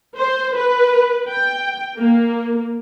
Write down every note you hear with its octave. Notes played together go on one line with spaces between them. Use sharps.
C5
B4
G5
A#3